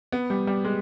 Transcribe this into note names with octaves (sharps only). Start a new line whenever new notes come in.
B3
G3
G3
G#3